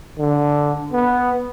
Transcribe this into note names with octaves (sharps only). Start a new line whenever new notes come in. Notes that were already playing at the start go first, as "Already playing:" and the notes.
D3
B3